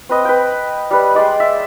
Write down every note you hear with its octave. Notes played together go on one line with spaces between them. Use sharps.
C4 B4 D#5
B4 G5
G3 B4
G#3 D5 G5 C6
E5